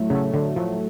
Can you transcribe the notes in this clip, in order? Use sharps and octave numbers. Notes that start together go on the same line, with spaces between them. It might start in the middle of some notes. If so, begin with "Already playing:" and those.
Already playing: A2 F#3 A3
C#3 F#3 A3
A2 D3
F3 F#3 A3